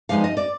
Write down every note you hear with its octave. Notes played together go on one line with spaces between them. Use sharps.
G2 F3 G#3 D#4 F5
D#5
D5